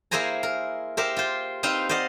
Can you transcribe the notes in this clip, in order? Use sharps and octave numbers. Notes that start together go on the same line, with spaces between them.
A#3 E4 G#4 C5 G#5 A#5
A#4
G4 A#4 C5 E5
F4 C5
C4 D#4 B4 C5 F5 G5
C5 D5 D#5 F5 F#5